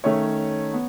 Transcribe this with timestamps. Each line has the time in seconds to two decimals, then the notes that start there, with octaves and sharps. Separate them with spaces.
0.04 D#3 A3 C#4 C#5
0.74 B3